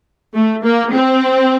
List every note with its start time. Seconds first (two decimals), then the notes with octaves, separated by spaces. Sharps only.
0.35 A3
0.64 A#3
0.92 C4